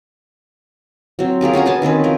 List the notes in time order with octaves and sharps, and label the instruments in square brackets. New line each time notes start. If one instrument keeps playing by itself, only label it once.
[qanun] F#3 C4
F4 G4 G#4 A#4
C#4 F#4 G#5 A#5
B3 C#4 G#5 A5
D#3 C4 C#4 B4
F3 A#4